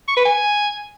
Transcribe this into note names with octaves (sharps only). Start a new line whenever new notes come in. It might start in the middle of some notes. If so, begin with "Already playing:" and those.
C#6
B4
G#5